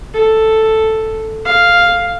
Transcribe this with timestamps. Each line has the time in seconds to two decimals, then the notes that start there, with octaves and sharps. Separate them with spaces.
0.13 A4
1.45 F5